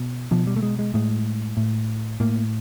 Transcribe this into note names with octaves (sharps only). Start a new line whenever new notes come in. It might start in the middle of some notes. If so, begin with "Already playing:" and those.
Already playing: B2
B2 F3
G3
A3
G#3
G#3
A2 G#3
A2
A2 A#3